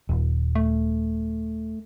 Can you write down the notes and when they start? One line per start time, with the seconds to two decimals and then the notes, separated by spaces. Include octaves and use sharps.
0.09 D#1
0.55 A3